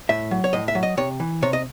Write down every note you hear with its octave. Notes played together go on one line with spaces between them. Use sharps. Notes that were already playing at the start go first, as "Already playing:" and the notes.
A2 E5
F#3
C#5
A2 D#5
E5
F#3
D#5
C3 C#5
E3
C3 C#5
D#5